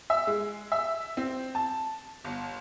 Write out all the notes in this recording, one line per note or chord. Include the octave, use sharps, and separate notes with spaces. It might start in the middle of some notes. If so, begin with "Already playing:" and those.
E5
G#3
E5
C4
A5
G1